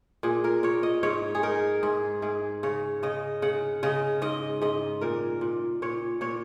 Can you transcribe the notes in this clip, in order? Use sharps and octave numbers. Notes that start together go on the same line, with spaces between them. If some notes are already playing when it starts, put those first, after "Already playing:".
A#2 G#4
A#4
A#2 C#5
D#5
G#2 C#5
G#4
D#4 A#4
G#2 G#4
G#2 G#4
C#3 C#5
C#3 D#5
C#3 F#5
C#3 D#5
G#2 D#5
G#2 D#5
A#2 A#4
A#2
A#2 C#5
A#2 C#5